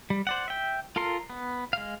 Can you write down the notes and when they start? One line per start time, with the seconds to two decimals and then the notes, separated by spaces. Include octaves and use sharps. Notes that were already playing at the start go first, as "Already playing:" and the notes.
0.10 G3
0.27 C5 D5 F#5
0.48 E5 G5
0.96 F4 A4 A#4 C6
1.30 B3
1.73 G#3 F5